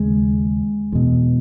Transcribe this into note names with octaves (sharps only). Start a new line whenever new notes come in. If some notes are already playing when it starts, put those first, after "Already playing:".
Already playing: D#2 C#3 G#3
E2 B2